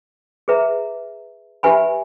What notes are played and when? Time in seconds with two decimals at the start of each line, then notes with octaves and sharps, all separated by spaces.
0.48 G#4 B4 E5 A#5
1.63 G4 B4 E5 G#5 B5